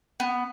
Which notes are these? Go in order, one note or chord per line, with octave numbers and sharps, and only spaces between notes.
B3